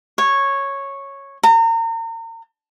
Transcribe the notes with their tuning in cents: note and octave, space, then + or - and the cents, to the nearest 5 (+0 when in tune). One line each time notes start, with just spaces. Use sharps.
C#5 -10
A#5 -35